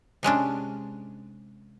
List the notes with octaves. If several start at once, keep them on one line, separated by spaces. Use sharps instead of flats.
C3 G#3 C#4 D4